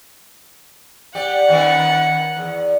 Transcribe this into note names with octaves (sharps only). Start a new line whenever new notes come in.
G4 D5 F#5
D#3 B3 C#4
E2